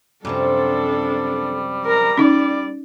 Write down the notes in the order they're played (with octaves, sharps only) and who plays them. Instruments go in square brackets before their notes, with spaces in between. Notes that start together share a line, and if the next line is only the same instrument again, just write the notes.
[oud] F#2 C3 F3 [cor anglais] G3 [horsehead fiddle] D4 A4
[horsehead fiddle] A#4 A#5
[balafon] C#4 D#4 [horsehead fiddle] D5